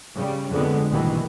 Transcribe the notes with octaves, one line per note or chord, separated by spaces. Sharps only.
C#3 G3
F2 D3 G#3 B3
A#1 G2 B2 D#3 E3